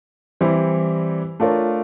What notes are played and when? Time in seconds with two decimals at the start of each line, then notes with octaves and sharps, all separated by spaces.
0.41 E3 G3 C4 E4 G4
1.40 A3 D4 F4 A#4 C#5